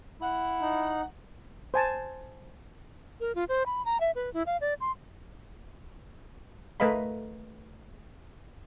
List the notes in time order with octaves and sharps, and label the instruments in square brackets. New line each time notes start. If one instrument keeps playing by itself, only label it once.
[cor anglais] E4 [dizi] F#5
[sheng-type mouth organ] D#4
[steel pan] C5 G#5 A5
[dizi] A#4
F4
C5
B5
A#5
E5
B4
E4
F5
D5
C6
[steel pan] A3 A#4 B4 D#5 F5 B5